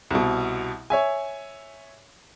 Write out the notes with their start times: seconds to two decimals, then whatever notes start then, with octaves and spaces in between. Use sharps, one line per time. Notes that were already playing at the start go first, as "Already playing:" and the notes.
0.11 C2 B2
0.90 C#5 E5 G#5